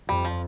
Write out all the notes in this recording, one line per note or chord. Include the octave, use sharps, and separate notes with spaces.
F2 G3
F3